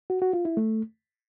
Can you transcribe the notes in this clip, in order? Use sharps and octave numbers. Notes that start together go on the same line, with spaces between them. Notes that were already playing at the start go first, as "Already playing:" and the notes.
F#4
F#4
F4
E4
A3